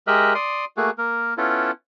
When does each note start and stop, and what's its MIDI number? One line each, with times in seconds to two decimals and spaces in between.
0.07 0.33 56
0.07 0.33 67
0.07 0.33 70
0.07 0.33 75
0.07 0.33 76
0.07 0.33 90
0.35 0.65 74
0.35 0.65 84
0.35 0.65 87
0.77 0.90 57
0.77 0.90 58
0.77 0.90 66
0.77 0.90 68
0.98 1.34 58
0.98 1.34 70
1.38 1.71 59
1.38 1.71 61
1.38 1.71 64
1.38 1.71 65
1.38 1.71 69